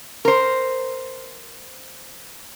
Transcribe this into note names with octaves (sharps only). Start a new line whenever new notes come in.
A#4 C5